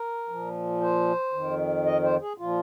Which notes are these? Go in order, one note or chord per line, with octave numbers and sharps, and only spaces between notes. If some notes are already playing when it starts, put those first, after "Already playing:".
Already playing: A#4
A#2 F3
C5
F2 D#3
D#5
C5
G#4
A#2 F3 F4